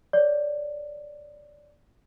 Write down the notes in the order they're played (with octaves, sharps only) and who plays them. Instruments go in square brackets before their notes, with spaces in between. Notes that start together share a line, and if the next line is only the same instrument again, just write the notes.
[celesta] C#5 D5